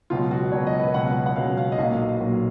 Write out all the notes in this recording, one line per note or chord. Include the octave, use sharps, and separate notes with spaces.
C#2 B2 F#3 F4
F#4
C#2 B2 F#3 C#5
D#5
B4
C#2 B2 F#3 F#5
F#5
C#2 B2 F#3 F5
F5
D#5
B1 A#2 F#3 F5
B1 A#2 F#3